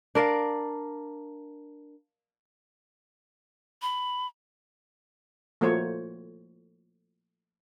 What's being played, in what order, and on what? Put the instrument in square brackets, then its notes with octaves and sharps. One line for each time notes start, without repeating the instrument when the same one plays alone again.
[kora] D4 A#4 D5 F5
[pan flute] B5
[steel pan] F3 A3 A#3 F#4 C5 C#5